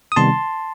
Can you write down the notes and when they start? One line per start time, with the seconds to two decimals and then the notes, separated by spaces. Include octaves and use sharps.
0.12 D#6
0.16 C3 D#3 G3 B3 D#4 A5 C6